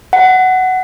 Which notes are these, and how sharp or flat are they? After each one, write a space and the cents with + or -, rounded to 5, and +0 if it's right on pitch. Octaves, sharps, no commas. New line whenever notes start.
F#5 +10